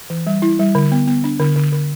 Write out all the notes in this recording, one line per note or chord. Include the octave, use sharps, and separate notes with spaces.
E3
G3
E4
G3
D3
B3
B3
D4
D3
D3
D3